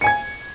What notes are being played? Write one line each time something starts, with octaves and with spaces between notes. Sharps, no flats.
G#5 G#6 C#7